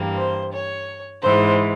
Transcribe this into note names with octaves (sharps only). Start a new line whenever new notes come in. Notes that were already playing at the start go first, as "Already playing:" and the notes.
Already playing: G2 E3 G3 A#3
C5
C#5
G#2 E3 G#3 C5